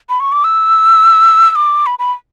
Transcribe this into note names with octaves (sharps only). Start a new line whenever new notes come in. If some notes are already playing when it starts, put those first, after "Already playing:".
B5
C#6
D6
E6
E6
D6
B5
B5